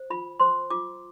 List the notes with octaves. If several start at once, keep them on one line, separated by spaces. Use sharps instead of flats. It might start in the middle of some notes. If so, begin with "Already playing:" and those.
Already playing: C5
F4 B5
C5 C6
F4 D6